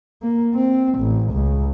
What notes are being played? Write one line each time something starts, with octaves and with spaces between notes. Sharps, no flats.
A#3
C4
A1
C#2